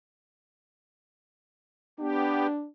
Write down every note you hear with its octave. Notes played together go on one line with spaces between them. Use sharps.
B3 D4 G4